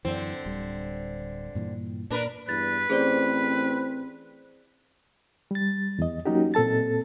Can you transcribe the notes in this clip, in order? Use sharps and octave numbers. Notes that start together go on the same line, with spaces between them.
F#2 D3 E3 C4
D1 G3
G2 A#2 E3
A#2 D4 A#4 B4
E2 G2 B4 A6
A1 C4 G#4 C5 D5
G3 A6
E2 D#5
F#3 A#3 C#4 D#4 F#4 G4
A#2 C4 A4 A5 A6